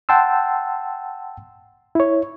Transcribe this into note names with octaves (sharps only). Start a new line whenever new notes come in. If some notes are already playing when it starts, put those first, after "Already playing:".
F#5 G5 A5 C6 E6
E4 C#5